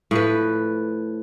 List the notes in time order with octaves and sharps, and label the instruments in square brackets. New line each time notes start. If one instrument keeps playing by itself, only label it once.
[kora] A2 F3 B4